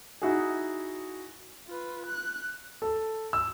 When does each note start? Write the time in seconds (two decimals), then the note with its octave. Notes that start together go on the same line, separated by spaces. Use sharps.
0.22 D#4 E4 F#4 G#4
1.67 F4 B4
2.06 F#6
2.82 A4
3.33 E6